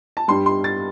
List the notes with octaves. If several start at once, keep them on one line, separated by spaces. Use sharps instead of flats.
A5
G2 G3 C6
C6
A6